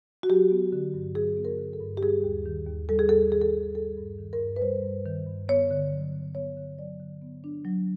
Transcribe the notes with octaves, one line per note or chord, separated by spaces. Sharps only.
F#4
F#3 G4
B3
D3
G2
F#3 G#4
B3
A#4
D3
A4
G2
G4
G3 G#4
D#2
D#3
D#2
G3 A4
G#4
D#2 A4
D#3 G#4
A4
D#2 G#4
G3 A4
G2
D#3
A#4
G2
B4
G3 C5
G2
D#3
G2
B3 C#5
D3
F#3
D3
B3 C#5
D3
F#3 D5
D3
B3
D4
F#3